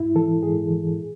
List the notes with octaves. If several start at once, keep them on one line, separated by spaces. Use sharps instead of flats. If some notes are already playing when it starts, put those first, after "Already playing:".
Already playing: G#2 E4
E3 A4
G#2 G#4
E3
A2